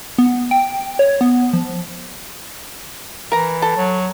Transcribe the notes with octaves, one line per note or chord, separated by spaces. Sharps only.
B3
G5
C#5
B3
F3
E3 A#4 A#5
A4
F#3